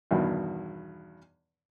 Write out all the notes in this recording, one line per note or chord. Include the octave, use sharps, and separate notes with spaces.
E2 G2 B2 D#3